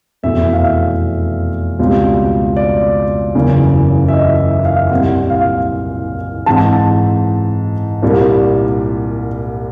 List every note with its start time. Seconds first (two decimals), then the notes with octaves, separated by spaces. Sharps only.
0.23 F1 E2 B2 E5
0.53 F5
0.63 E5
1.79 C#2 B2 G3 C4
2.57 D5
3.35 F#1 E2 C#3
4.08 E5
4.13 D#5
4.39 E5
4.65 F5
4.91 C2 A#2 G3 C4 F#5
5.30 F5
6.46 G#2 E3 G#3 C4 A5
8.02 C2 A#2 G3 A#3